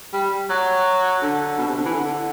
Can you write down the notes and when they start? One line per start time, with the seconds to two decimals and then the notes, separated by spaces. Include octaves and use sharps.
0.13 G3
0.50 F#3
1.21 D3
1.58 B2
1.67 C3
1.76 D3
1.85 E3
1.94 D3